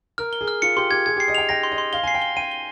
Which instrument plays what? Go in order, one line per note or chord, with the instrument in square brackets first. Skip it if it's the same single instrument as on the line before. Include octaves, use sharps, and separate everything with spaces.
[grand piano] A#4 [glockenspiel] F6
[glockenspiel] G7
[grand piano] G#4
[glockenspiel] F6
[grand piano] F4 [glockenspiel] C#7
[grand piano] G4 [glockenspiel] C6
[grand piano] G4 [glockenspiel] G#6
[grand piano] G#4 [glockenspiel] G#6
[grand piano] G4 [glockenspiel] C7
[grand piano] D#5
[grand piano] G5 [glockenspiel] F7
[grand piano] G5 [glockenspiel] A#6
[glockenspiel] C6
[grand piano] D#5
[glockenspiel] C6
[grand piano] F5 [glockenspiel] G7
[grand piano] G#5 [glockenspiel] C7
[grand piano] G5
[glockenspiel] G7
[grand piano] G5 [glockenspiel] D#7
[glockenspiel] G7